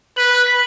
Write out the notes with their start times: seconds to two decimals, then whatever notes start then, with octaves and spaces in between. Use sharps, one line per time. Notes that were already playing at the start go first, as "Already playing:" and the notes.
0.17 B4 F#7
0.31 F#6
0.47 B6